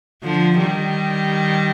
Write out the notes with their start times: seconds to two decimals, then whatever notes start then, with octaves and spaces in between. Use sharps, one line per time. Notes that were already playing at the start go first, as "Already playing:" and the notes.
0.23 D3 F3
0.58 D#3 G3